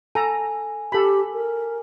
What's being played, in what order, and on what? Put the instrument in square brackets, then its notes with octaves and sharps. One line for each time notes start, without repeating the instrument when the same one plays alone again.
[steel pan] A4 A#5 [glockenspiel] G#5
[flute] G4 [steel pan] A4 B5
[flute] A#4